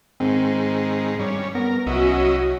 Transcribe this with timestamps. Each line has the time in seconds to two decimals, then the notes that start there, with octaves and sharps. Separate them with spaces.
0.20 G#2 D#3 C4
1.19 G2 G3 C#4
1.55 B3 A#4
1.87 C2 F#3 C#4 E4 F#4 D#5